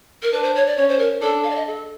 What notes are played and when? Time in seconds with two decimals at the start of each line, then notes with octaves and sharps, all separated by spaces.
0.23 A#4
0.32 D4 B4
0.43 C5
0.55 C#5
0.67 D5
0.77 C#4 C#5
0.89 C5
0.99 A#4
1.22 D4 A4
1.44 F5
1.51 D5
1.55 D#5
1.67 A4